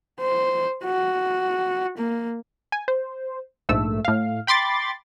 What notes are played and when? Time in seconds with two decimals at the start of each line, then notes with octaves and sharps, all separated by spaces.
0.20 C5
0.85 F#4
1.98 A#3
2.72 G#5
2.88 C5
3.69 A#1 G#2 A3 E6
4.05 A2 F5
4.47 G5 B5 C6 D6 A6